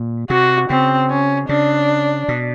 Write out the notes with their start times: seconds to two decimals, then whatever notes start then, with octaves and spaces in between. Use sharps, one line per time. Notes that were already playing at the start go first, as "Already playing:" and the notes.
Already playing: A#2
0.30 C3 F#4
0.70 C#3 C4
1.10 C#4
1.49 C#3 D4
2.28 B2